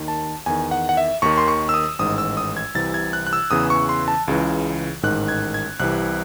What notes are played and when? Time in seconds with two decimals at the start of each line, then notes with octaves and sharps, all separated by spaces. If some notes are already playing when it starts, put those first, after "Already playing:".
Already playing: D#2 D#3
0.08 A5
0.46 E2 D#3 G#5
0.71 F#5
0.89 F#5
0.97 E5
1.22 D#2 D#3 C#6
1.38 C6
1.48 C#6
1.69 E6
1.74 D#6
1.99 A1 G#2 D#3 D#6
2.18 E6
2.37 D#6
2.57 G#6
2.74 C2 C3 E3 A6
2.94 G#6
3.13 F#6
3.27 F#6
3.33 E6
3.51 E2 C#3 E3 D#6
3.70 C#6
3.89 C6
4.08 A5
4.28 C#2 C#3 E3
5.03 A1 G#2 D#3 F#6
5.28 G#6
5.54 G#6
5.80 C2 C3 E3 F#6